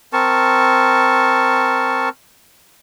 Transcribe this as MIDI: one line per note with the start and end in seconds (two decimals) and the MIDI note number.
0.13 2.09 60
0.13 2.09 70
0.13 2.09 81
0.13 2.09 85